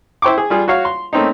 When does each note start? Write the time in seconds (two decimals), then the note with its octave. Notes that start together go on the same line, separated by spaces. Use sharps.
0.22 E4 C5 G5 C#6 D6
0.38 G#4
0.50 G3 F4 G#4
0.68 F#4 C#5 F5
0.85 C6
1.13 A3 A#3 C4 C#4 D#4